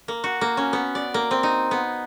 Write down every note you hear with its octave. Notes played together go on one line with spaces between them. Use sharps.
A#3
F#4
A#3
C#4
B3
D5
A#3
C4
D#4
B3